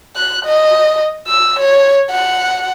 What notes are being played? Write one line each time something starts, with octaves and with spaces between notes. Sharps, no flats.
F#6
D#5
E6
C#5
F#5